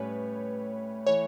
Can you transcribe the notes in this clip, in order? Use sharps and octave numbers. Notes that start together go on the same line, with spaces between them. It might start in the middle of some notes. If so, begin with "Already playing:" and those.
Already playing: A2 G3 C#4 B4 C#5
E3 A3 C#5